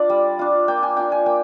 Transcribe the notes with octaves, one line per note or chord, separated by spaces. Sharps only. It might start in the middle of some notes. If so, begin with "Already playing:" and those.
Already playing: D4 F4 D5
G3
D4 F4
A#3 G5
G#5
D4 F4 G5
G#5
A#3 G5